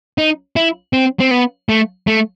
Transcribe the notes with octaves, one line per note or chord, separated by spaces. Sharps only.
D#4
E4
C4
C4
B3
A3
A3